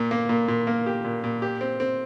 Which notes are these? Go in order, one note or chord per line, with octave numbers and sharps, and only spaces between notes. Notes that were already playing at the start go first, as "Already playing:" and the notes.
Already playing: A#2
A#3
A#2
A#2
A#3
G4
A#2
A#2
G4
C4
C4